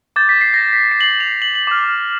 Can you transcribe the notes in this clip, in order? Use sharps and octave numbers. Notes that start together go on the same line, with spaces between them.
D6 G6 A6
B6
C7
A#6
B6
C7
F#7
F7
F#7
F#7
D6 F6